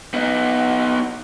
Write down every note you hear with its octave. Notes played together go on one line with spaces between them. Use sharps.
B3 D#4